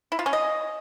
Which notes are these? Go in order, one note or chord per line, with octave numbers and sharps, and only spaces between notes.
E4
F4
C#4
D#5